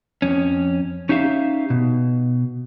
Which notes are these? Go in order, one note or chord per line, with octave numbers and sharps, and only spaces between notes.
F2 C#4
C#4 D#4 G4 E5 F5
B2